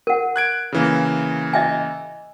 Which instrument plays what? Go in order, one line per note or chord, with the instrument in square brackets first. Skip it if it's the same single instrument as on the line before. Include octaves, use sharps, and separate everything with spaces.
[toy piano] A#4 F#5
[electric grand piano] F#6 G#6 D7
C#3 E3 A#3
[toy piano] D#5 E5 G#5